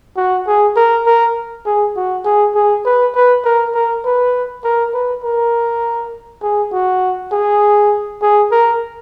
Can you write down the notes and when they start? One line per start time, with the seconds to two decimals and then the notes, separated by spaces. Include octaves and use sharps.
0.17 F#4
0.47 G#4
0.76 A#4
1.06 A#4
1.66 G#4
1.96 F#4
2.25 G#4
2.55 G#4
2.85 B4
3.15 B4
3.45 A#4
3.74 A#4
4.04 B4
4.64 A#4
4.93 B4
5.24 A#4
6.43 G#4
6.72 F#4
7.32 G#4
8.22 G#4
8.51 A#4